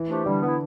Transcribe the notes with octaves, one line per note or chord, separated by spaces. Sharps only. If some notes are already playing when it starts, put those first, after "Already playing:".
Already playing: E3
F3 A3 D4 G4
D3 G3
B3 E4